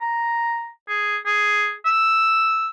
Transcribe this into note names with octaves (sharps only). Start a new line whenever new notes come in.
A#5
G#4
G#4
E6